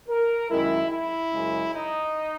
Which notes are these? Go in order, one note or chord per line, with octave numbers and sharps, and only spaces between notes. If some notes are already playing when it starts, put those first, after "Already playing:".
A#4
F#2 D#3 G#3 E4
E4
F#2 C#3 G#3
D#4